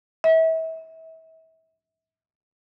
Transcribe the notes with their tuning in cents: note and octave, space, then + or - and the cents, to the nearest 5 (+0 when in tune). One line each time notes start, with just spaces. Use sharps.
E5 -35